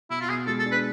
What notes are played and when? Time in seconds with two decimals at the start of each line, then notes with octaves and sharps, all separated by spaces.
0.10 B2 E4
0.21 F4
0.28 B2 G#4
0.47 G#3 A4
0.59 A4
0.66 D4
0.72 B4